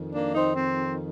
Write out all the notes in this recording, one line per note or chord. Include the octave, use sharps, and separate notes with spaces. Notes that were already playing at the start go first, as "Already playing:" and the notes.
Already playing: F2 D#3
A#3 D4
C4 D#4
C4